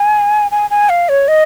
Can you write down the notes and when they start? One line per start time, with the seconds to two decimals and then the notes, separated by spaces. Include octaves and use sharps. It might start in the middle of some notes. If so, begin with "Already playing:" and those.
Already playing: G#5
0.51 G#5
0.70 G#5
0.89 F5
1.09 C#5
1.28 D#5